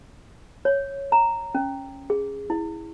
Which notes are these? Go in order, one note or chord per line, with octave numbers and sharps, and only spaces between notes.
C#5
A#5
C#4
G#4
E4